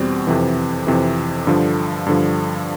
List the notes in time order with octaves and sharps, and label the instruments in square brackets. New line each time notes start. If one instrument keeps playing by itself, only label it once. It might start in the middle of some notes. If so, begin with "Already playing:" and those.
Already playing: [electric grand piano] E2 B2 G3 C4
F2 C3 E3
F2 C3 E3
G2 D3 F3
G2 D3 F3